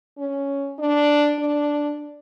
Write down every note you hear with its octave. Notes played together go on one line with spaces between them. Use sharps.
C#4
D4
D4